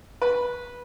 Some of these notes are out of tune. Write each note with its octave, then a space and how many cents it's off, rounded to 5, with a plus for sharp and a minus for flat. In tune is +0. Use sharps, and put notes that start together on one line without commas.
B4 -15